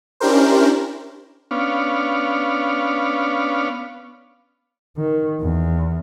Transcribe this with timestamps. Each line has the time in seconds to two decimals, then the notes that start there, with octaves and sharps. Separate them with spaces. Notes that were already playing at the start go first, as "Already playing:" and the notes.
0.20 C#4 D4 E4 G4 A#4 C5
1.51 B3 C#4 D4 F5
4.97 D#3
5.40 E2